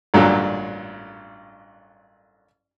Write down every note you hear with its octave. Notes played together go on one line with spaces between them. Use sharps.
A1 G2 A#2 D3 F#3 A4